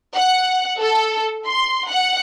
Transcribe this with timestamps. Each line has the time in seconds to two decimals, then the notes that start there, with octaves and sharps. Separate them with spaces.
0.16 F#5
0.80 A4
1.46 C6
1.89 F#5